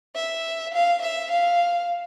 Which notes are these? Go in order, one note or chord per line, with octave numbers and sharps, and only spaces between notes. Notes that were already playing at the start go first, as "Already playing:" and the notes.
E5
F5
E5
F5